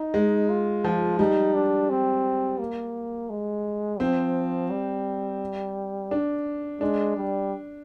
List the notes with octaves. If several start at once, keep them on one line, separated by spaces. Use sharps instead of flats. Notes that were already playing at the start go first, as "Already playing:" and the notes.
Already playing: D#4
G#3
F4
F3
G3 D#4
D4
C4
A#3
G#3
F3 C4
G3
D4
G#3 D4
G3